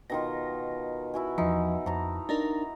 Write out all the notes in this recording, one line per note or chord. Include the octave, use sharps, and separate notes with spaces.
B2 D#3 F4 A#6
E4 F#4 G#5
E2 F3 D#4 E4
F2 A5 A#5
D4 D#4 A#4 A#5